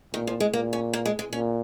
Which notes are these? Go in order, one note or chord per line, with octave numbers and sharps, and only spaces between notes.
A#2 D#3
F3
G#3
A#2 A#3
C#4
A#3
G#3
G#3
A#2 C#4